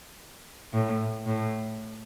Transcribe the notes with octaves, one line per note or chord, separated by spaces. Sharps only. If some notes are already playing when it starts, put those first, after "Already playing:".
A2
A2